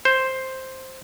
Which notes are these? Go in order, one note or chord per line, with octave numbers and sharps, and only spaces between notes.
C5